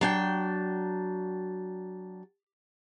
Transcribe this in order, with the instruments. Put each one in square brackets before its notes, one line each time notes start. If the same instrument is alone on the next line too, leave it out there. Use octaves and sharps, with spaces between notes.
[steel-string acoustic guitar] F#3 D4 G5